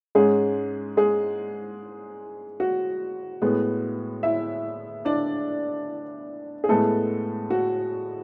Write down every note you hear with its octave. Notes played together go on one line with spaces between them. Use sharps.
G#2 G#3 C#4 G#4
G#3 G#4
F#4
A2 G#3 B3
E4 E5
D4 D5
G#4
A2 G#3 A3 B3 A4
F#4